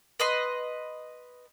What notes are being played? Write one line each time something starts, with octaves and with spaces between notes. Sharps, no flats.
B4 D#5 C6